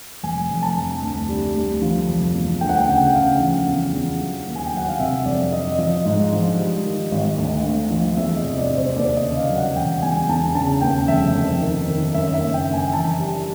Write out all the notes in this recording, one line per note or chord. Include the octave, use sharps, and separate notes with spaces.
F1 G#5
F1
A5
F2
D2
G3
D2
F3
F1
E2
D2 G5
F#5
G5
C#3 F#5
C#3 F5
F3
E2
E2
F#3
D#2
G#5
G5
F#3 F#5
F5
C3 E5
F2 D5
F#3 D#5
F3 D#5
G#2
F3
G3
D#3
G#1
D2
D2
F3
E2 E5
D#5
C3
D5
C3
C5
D#2 D5
D#5
C#3
F5
F#3
F#5
E1 G5
E2 G#5
E2 A5
C#3 A5
D#2 G5
F1 E5
F2
D#3
D#3
F#2 E5
E5
F#1
G5
F#1
G#5
E3 A5
G3